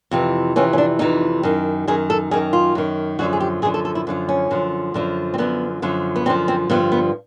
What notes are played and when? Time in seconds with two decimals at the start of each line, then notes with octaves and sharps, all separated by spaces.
0.11 F2 C3 E3
0.56 F2 C3 E3 C#4
0.73 C#4
0.78 D4
0.99 F2 C3 E3 D#4
1.43 F#2 D#3
1.88 F#2 D#3 G#4
2.10 A4
2.31 F#2 D#3 G#4
2.53 F4
2.75 F#2 D#3
3.19 F#2 D3 F3 F#4
3.33 G#4
3.40 G4
3.62 F#2 D3 F3 G#4
3.74 A4
3.85 A4
3.95 E4
4.07 F#2 D3 F3
4.29 C#4
4.50 F#2 D3 F3
4.94 F#2 D3 F3
5.34 C4
5.38 F#2 D3 F3 B3
5.82 F#2 D3 F3
6.16 B3
6.26 F#2 D3 F3 C4
6.48 C4
6.69 G2 D3 F3 B3
6.92 B3